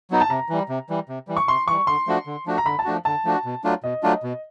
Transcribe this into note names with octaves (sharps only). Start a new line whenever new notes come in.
F#3 B3 D#4
A5
C3 A#5
E3 G3
C3
E3 G3
C3
E3 G3
C#6
C3 C6
E3 G3 C#6
D3 C6
F3 A3 D4 F#4
D3
F3 A3 D4 F#4
A#5
D3 B5
A5
F3 A3 D4 F#4
D3 A5
F3 A3 D4 F#4
B2
F#3 A3 D4 F4
B2 D#5
F#3 A3 D4 F4
B2